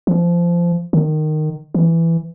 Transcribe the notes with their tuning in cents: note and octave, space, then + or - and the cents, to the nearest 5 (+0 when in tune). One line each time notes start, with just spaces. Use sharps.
F3 -20
D#3 -15
E3 +10